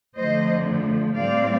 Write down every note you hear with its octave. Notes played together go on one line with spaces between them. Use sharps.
F2 D3 F3 A3 C5 D#5
A2 G3 C4 D5 F5